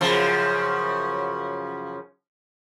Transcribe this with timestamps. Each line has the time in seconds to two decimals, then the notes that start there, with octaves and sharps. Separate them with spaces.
0.01 F#2 C#3 F3